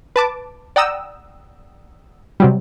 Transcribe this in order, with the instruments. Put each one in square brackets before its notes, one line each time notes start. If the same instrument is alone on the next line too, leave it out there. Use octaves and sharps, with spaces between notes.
[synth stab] B4 A5 D6
D5 F#5 G5 A#5 D#6 E6
C3 F#3 G3